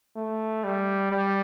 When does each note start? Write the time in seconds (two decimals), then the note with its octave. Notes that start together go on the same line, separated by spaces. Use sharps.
0.16 A3
0.64 G3
1.11 G3